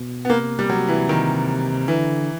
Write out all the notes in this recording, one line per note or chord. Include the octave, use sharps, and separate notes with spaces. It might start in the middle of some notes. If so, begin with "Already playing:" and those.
Already playing: B2
B3
C3 A#3
G3
F#3
E3
D#3
D3 E3